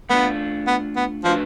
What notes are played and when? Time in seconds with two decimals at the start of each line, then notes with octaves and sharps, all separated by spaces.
0.10 A3 B3 D4 F4
0.67 B3
0.96 B3
1.25 F3 A3 D4 F#4 B4 D#5